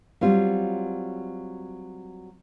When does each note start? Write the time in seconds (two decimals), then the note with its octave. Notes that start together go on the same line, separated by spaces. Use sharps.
0.21 F#3 G3 C4 F4